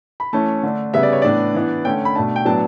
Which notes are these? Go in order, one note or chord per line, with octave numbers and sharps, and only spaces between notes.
B5
E3 A3 C#4 A5
D3 A3 D4
C#3 G3 B3 E5
D5
C#5
A2 E3 B3 D4 D5
E3 B3 D4
D3 A3 C#4 G5
B5
B2 A3 D4 A5
G5
A2 F#3 B3 D4 A5